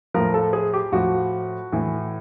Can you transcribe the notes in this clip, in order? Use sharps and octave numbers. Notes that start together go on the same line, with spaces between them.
A2 F3 A#4
A4
G#4
G4
A2 F3 F#4
A2 E3